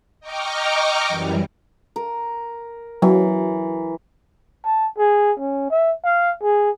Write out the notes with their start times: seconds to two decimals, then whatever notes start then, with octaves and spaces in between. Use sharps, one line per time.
0.20 D#5 G5 A#5 C#6 D6 F6
1.08 F#2 E3 G3
1.96 A#4
3.02 E3 F#3
4.65 A5
4.98 G#4
5.40 C#4
5.71 E5
6.05 F5
6.42 G#4